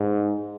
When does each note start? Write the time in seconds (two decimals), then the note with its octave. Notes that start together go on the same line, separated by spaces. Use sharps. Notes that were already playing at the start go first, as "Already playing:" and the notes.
Already playing: G#2